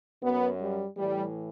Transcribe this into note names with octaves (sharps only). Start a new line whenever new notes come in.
F#2 F#3 B3
G3
A2 E3 G3